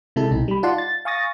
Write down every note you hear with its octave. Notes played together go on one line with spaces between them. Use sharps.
C3 G#3 E4 A4 A5
B1 C3 D#4
G3 B5
D#4 F4 D5 F#5 A5 C6
A6
F5 G#5 C#6 D#6 A6 A#6